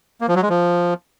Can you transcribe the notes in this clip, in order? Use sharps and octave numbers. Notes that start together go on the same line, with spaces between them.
A#3
F3
F#3
G#3
F3